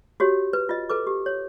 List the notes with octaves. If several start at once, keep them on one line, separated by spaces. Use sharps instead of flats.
F#4 G4 C#5
B4
F4 D#5
A4 B4 D6
G4
C#5